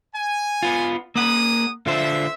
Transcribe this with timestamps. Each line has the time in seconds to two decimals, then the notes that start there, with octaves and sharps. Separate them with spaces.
0.14 G#5
0.63 B3 F4
1.16 A#3 D4 G#4 F#5 D#6
1.86 D3 F4 C5 E5